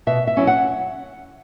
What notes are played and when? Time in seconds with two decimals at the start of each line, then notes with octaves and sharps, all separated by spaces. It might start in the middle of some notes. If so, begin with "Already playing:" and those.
0.07 B2 E5
0.27 E5
0.37 F#3 C#4 E4
0.47 F#5